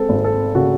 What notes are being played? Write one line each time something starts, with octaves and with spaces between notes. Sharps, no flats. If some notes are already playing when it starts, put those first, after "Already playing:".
Already playing: G#3 C4 A4
G#1
A4
C#3 F#4